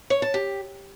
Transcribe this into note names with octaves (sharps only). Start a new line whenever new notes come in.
C#5
A5
G4